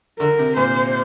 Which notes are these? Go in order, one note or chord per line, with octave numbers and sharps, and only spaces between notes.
D3 A#4
C3
A#2 C5